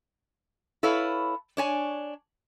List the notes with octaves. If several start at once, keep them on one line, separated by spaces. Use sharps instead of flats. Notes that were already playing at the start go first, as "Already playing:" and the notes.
E4 A4 B4 C#5 F5
D4 C#5 G#5